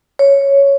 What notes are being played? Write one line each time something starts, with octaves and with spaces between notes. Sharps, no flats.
C#5